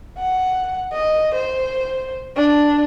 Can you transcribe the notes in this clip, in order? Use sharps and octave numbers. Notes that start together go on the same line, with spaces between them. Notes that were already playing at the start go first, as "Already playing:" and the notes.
F#5
D#5
C5
D4